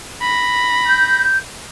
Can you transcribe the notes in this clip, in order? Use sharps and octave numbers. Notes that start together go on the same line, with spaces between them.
B5 A#6
G6